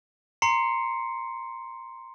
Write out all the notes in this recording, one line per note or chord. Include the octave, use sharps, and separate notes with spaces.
A#5 C6 C7 C#7